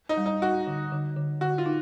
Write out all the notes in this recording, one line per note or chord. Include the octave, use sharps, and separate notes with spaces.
D#4
G3
D#4
D#4 F#4
D3
D3
D3
D3 F#4
F4
D#4